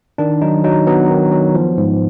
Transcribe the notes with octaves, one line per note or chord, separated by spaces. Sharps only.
D#3 D4
F#3 D#4
F#3 D#4
F#3 B3
D#3
F#3
F3
G#2